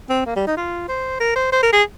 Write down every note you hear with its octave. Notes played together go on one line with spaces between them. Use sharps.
C4
A#3
G3
D#4
F4
C5
A#4
C5
C5
A#4
G#4